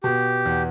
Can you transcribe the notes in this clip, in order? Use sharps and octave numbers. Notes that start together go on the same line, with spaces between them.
B2 G4
E2